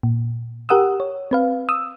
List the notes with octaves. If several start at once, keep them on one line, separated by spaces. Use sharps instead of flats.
A#2
G4 A#4 F#5 D#6 E6
C#5
C4 B4 F5
D#6 E6